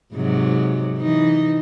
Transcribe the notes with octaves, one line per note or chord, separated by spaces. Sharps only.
G#2 C3 F#3
E3 D#4